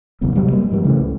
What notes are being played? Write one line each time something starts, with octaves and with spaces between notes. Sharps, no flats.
F#1 B1 E2
C3 F#3 G3
G3 A#3
G#2 F3 G3
C#3 E3 A3
C#2